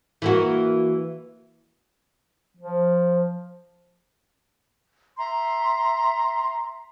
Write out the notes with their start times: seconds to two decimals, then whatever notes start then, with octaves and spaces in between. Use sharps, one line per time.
0.22 E3 A#3 F#4
2.57 F3
5.17 E5 A#5 C6